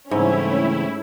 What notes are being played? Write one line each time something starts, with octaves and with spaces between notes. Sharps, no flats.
G#2 C#3 E3 G3 A3 C4 C#4 E4